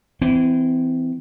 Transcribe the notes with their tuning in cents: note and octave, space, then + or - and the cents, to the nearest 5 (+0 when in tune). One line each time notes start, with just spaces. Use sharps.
E3 +0 C4 -30